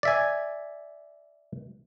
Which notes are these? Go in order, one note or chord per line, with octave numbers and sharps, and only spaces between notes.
D5 E5 G#5